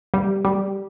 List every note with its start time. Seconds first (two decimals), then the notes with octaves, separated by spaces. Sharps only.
0.14 G3
0.45 G3